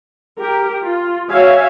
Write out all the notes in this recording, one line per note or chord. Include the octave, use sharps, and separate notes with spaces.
G4 A#4
F4
F#4 C#5 E5 F5 G#5